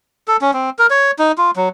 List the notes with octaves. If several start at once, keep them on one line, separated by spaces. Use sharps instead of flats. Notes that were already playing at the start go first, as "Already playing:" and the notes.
A4
C#4
C4
A#4
C#5
D#4
F4
F#3